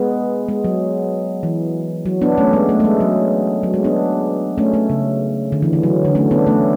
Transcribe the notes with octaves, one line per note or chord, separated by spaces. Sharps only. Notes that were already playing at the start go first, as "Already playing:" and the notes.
Already playing: G#3 B3
G#3
F#3
E3
F#3
B3 D4
A3 C#4
G#3 B3
A3
A3
G#3
F#3
F#3
G#3
B3 D4
A3 C#4
A3
C#3
D3
E3
E3
F#3
D3
A3 C#4
B3 D4
A3 C#4